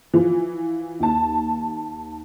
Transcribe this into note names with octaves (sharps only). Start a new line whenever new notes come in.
E3 F3
D#2 A5